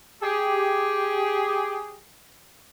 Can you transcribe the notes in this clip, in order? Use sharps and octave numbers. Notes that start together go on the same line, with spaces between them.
G4 G#4